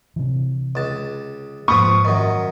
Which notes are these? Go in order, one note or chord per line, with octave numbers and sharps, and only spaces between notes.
C3 E3
C#2 A5
G#2 F3 A#3 B4 C#6 D#6
F#2 D#3